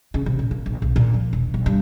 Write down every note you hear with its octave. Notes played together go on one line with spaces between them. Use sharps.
C#3
C3
A#2
A#3
A#1
B1
A#2
F3
E1
B1
G2